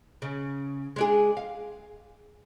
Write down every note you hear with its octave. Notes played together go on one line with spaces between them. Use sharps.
C#3
G#3 D4 G#4
F5